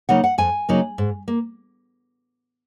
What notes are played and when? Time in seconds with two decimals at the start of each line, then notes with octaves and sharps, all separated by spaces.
0.09 C#3 F#3 A#3 D#4 F#5
0.24 F#5
0.38 F2 G#5
0.69 C#3 F#3 A#3 D#4
0.98 G#2
1.28 A#3